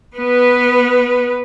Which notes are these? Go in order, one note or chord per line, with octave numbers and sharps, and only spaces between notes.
B3 B4